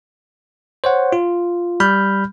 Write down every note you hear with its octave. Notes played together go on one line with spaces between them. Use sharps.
C5 C#5 F#5
F4
G3 B5 F6 G6